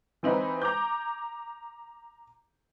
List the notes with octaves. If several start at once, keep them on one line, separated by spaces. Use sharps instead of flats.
E3 C4 D#4 E4 B4
A#5 D6 G6